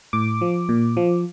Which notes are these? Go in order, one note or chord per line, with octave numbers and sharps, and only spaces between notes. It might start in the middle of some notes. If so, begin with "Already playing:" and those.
A2 D6
F3
A#2
F3